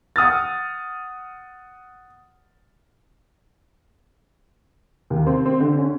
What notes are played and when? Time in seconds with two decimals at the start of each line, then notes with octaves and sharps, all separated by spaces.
0.16 F#5 D#6 F6 A6
5.10 D#2
5.27 C4
5.46 C4
5.60 D3
5.78 C#4